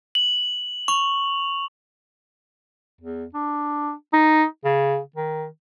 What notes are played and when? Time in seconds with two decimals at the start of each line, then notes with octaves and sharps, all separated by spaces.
0.15 F#7
0.88 C#6 F7
3.01 E2
3.34 D4
4.13 D#4
4.64 C#3
5.16 D#3